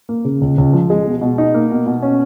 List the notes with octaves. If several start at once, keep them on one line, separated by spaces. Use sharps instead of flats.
A#3
C#3
C#2
C#2
F3
G#3
B2
B2
D#4
A#3
B2
B2
C#4